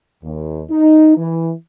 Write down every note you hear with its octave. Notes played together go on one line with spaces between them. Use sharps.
D#2
D#4
E3